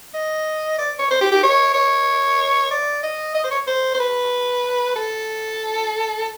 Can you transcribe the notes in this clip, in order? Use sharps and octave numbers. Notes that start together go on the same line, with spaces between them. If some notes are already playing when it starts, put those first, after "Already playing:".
D#5
D5
C#5
C5
G4
G4
C#5
C#5
D5
D#5
D#5
C5
C#5
C5
C5
B4
A4